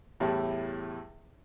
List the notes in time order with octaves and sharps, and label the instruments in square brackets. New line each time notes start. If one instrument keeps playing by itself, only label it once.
[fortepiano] E2 A2 G3 E4